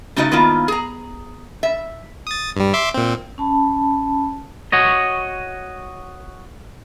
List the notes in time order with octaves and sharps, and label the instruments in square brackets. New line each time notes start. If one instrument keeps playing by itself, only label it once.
[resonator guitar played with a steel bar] C#3 A3 D#4 F#4 D5 D#5
D#3 G#3 A#3 B3 E4 F4
G#4 A#5
E5
[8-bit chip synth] D#6 A6
G2 G3
E5 C6 D6
A#2 C4
[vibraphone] C#4 A5 B5
[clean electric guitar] F#4 C#5 D#5